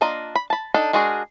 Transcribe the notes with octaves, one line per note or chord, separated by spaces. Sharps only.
A#3 D4 F4 D#5 A#5
B5
A5 B5
D4 D#4 A4 G5
G#3 D4 F#4 G#4 A#4